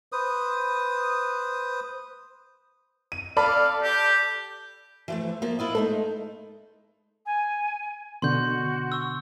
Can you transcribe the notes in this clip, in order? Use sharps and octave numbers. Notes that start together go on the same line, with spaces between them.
B4 C5 D#6
D#7
A4 D5 F5 B5
G4
E3 F3 A3
F3 A#3
E4 F4 D#5
G#3 A3 D#4 A4
G#5
B2 D3 F#4 C6 G6
C#6 E6